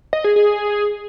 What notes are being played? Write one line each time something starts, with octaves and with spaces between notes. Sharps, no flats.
D#5
G#4
G#4